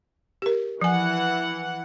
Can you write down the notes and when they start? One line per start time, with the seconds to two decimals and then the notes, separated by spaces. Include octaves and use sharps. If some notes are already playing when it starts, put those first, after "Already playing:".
0.42 G4 A#4
0.81 E3 F3 F#5 G#5